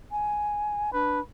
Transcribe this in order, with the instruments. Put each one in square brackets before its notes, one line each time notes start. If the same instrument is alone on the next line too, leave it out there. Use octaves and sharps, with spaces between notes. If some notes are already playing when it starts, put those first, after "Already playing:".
[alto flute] G#5
[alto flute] D4 [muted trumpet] B4